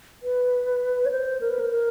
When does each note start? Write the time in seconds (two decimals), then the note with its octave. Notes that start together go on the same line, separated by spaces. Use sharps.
0.23 B4
1.06 C#5
1.11 C5
1.41 A#4
1.50 B4
1.59 A#4
1.71 A#4